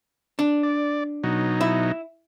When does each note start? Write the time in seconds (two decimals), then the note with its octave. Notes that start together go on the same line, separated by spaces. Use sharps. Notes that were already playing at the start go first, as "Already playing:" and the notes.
0.39 D4
0.63 D5
1.24 B2 F#3 D#4
1.61 E4